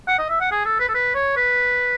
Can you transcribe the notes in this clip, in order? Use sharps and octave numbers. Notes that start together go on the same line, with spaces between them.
F#5
D#5
E5
F#5
G#4
A4
B4
A4
B4
C#5
B4